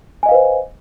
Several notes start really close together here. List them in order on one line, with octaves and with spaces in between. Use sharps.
G#5 D#5 F5 B4 C5